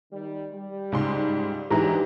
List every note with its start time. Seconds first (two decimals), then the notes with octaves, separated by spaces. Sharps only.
0.11 D#3 G3
0.53 G3
0.92 C#2 G#2 C6
1.71 G#2 E3 F#3 D4 G4 G#4 A#5